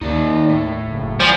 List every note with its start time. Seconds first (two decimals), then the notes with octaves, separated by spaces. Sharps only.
0.01 D#2 D#4 D5
0.48 A2
0.87 F#1
1.20 F3 D5 F#5 G#5